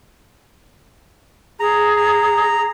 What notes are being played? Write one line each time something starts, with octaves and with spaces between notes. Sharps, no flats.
G#4 A#5
A#5